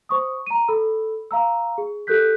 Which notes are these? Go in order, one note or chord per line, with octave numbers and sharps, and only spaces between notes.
C5 C#6 D#6
A#5 D#7
A4 B5 E6
F5 A#5 E6
G#4
G4 A4 A#4 F#6 G6 B6